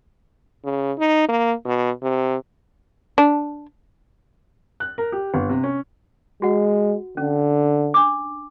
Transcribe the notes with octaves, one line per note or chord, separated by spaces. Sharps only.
C#3
D#4
A#3
B2
C3
D4
F#6
A#4
G4
G1
C3
C#4
G#3 F#4 F#5
D3 C#4
D4 D6